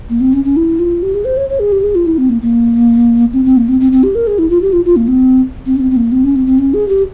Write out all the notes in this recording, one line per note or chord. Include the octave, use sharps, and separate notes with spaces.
A#3
C4
C#4
C#4
E4
F4
G4
G#4
C5
C#5
C#5
G#4
G4
G#4
F4
E4
C4
A#3
A#3
C4
C4
A#3
C4
C4
C4
G4
A#4
G#4
E4
F4
G4
F4
F4
A#3
C4
C4
C#4
C4
C4
A#3
C4
C#4
C4
C4
C#4
G#4
G4